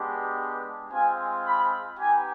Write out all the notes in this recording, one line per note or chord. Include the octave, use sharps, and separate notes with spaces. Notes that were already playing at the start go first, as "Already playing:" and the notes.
Already playing: G#3 B3 D4 G4
G#3 C4 F4 G#5
B5
B3 D#4 G4 G#5